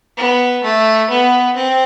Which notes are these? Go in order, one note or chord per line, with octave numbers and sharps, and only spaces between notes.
B3
A3
B3
C4